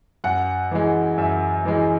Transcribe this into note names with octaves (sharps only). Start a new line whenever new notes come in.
F#2 F#5
E3 G#3
F#2 E5
E3 G#3